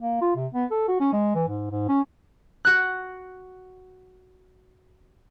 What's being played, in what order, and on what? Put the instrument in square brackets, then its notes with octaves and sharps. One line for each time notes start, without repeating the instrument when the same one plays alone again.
[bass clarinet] A#3
F4
C3
B3
A4
F#4
C#4
G#3
E3
G#2
G#2
C#4
[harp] F#4 F#6